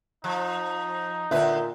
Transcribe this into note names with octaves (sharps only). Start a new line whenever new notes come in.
F3 D#4
A#2 D3 B4 E5